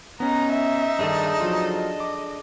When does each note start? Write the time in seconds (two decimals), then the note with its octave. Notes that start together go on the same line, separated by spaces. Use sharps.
0.20 B3 C#4 D#4 A#5
0.52 E5
0.99 G2 D#3 D4 G#4 A4
1.41 F3 F#3 F4
1.71 D#5
2.00 D6